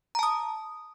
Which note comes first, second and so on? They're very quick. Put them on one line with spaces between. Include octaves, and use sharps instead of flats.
A#5 A5 D#6